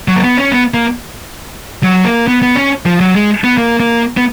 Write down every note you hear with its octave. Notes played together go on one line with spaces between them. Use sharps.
F#3
A#3
B3
C#4
B3
A#3
F#3
A#3
B3
B3
C#4
F3
F#3
G#3
B3
A#3
A#3
B3